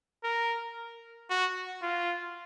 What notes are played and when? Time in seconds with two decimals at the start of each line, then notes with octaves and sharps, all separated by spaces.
0.24 A#4
1.30 F#4
1.83 F4